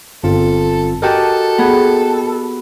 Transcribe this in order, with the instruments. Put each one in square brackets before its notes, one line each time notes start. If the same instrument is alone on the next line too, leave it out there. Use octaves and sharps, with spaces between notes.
[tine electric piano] G1 C4 F4 [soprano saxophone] A4
[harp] F#4 G4 D#5 [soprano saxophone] A4 [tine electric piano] A#4 G5 A5
[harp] B3 [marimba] G#4 F#5